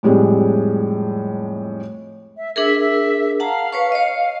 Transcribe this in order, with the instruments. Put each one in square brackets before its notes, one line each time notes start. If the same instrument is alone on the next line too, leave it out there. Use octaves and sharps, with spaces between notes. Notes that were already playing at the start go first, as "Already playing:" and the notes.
[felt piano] F2 A2 G3 G#3
[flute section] E5
[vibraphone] D4 G#4 A#4 [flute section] E5
[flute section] E5
[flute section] F5 [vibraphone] F#5 A5 A#5
[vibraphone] B4 C#5 C#6
C#5 D#5